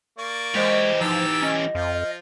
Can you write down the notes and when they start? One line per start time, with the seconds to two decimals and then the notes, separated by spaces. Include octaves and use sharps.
0.18 A#3 D5 C#6
0.55 E3 G#3 G4 C5 D#5
1.01 F3 D#4 A5 E6
1.42 C#4 D#5
1.75 F2 F3 F4